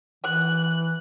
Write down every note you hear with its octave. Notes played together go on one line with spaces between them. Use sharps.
E3 F#6